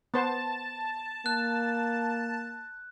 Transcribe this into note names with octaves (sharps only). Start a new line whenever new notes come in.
B3 C5 A5
A#3 F#6